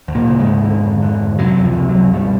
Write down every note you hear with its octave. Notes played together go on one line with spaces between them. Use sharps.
D2
A#2 A#3
C#3
G#2 G#3
D2
D3
F2
D3
F2
F#2 C3 F#3
C#2
F2 F3
C3
F#2 F#3
C#2
G2 B2 G3